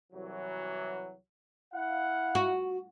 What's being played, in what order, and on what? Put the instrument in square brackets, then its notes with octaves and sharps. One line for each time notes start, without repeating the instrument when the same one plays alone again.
[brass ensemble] C2 E3 F#3
E4 F5 F#5
[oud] F#4